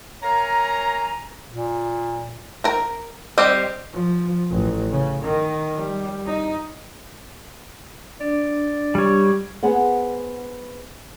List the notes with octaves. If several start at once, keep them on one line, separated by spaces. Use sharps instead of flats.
A#4 C#5 F5 G#5 A#5
A#2
A#4 A#5
G3 C4 G4 C5 D#5
F3
A1
C#3
D#3
G3
D#4
D4 D5
G3 C#5
B3 G#4 C5 F#5